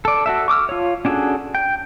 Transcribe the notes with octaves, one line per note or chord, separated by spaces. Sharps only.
A4 D5
F#4 A4 E5
C#6 D6 E6 F6
F4 C#5
C#4 D4 F#4 G#4 A4
G5